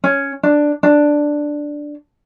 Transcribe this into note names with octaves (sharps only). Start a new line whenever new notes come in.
C#4
D4
D4